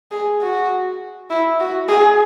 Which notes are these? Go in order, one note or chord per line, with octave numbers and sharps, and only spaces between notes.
G#4
F#4
E4
F#4
G#4